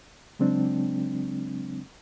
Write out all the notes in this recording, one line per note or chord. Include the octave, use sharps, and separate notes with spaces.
C#3 F#3 G#3 C4 D4